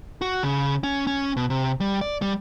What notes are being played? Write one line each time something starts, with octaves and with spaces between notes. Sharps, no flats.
F#4
C#3
C#4
C#4
B2
C3
G3
D5
G3